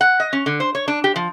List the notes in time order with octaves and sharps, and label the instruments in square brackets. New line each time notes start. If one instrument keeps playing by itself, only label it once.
[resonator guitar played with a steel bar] F#5
D#5
C#4
D3
C5
C#5
D4
G4
F3